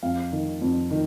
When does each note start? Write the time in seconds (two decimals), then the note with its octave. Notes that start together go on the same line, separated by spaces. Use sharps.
0.03 F2 F5
0.32 D#3
0.62 F2
0.91 D#3